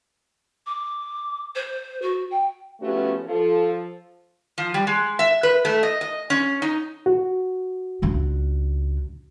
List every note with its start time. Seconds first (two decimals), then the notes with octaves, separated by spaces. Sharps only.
0.66 D6
1.55 C5
2.02 F#4
2.30 G5
2.81 F3 A3 B3 C#4 F#4 G4
3.26 F3 A4
4.58 F3
4.74 G3
4.87 G#3
5.19 E5
5.43 B4
5.65 A3
5.83 D#5
6.01 D#5
6.30 C#4
6.62 D#4
7.06 F#4
8.02 C#2 D4